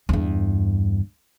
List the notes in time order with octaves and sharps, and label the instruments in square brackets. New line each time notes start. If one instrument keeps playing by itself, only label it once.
[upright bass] E2 G2